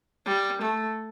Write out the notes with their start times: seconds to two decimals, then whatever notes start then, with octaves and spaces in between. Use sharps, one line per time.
0.26 G3
0.61 A3